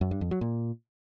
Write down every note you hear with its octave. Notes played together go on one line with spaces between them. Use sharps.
F#2
G2
F2
F#3
A#2